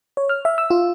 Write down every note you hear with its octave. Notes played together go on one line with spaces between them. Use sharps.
C#5
F6
E5
E6
F4